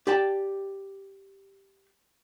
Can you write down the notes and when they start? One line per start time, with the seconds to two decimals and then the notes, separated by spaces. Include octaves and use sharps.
0.07 G4 D5 G5 A5